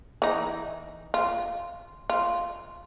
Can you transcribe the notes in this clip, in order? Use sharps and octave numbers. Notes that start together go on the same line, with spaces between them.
E3 D#4
F4
F4